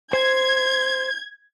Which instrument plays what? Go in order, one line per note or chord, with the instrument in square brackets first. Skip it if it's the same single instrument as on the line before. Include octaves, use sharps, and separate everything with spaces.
[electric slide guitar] C5 [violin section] G#6